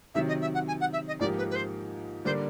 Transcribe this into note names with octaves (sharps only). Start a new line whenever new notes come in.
C3 D#3 F#3 E5
D#5
E5
F#5
G#5
F#5
E5
D#5
G#2 F3 A#3 D#4 G4 D5
B4
B4
C5
D3 G3 A#3 D4 C5